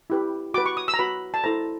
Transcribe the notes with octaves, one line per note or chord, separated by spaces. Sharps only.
E4 G4 B4
F#4 B4 D6
C#6
D#6
E6
A#5
F#4 B4 B5
A5
E4 A4 C5 A#5